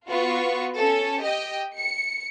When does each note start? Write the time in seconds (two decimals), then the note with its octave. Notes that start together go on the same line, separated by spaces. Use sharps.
0.10 B3 F4 F#4 C#6
0.78 C#4 A4
1.22 G4 D#5 G5
1.79 C#7